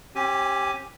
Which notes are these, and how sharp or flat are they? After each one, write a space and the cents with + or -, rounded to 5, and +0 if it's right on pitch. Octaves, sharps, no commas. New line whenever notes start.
C#4 -40 G4 +0 G#5 +0